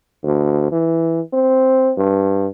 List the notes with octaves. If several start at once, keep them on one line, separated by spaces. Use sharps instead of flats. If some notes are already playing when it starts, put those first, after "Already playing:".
D2
E3
C4
G2